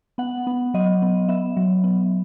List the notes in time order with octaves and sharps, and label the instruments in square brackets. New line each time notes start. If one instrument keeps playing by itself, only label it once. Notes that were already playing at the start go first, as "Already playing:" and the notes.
[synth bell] B3 F#5
B3
F#3 D#5
B3
B3 E5
F#3
B3